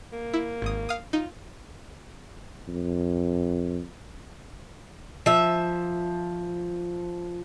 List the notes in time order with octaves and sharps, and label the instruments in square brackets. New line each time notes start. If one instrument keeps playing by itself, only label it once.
[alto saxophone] A#3
[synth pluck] E4
G#1 D#6
F5 D#6
[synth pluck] D#4 [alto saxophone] F4
[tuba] F2
[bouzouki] F3 E5